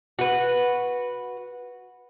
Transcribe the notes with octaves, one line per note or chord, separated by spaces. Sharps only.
F#4 B4